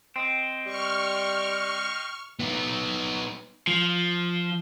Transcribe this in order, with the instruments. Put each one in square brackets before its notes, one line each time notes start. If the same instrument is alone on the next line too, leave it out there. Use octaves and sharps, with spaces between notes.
[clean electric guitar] C4 [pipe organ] D#5 G5 C6
[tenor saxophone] G3 [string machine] C#6 F6
[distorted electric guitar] B3 D#4
[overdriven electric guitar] F3